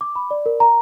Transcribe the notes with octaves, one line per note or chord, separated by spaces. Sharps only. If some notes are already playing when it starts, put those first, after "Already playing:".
D6
B5
D5
A#4
A#5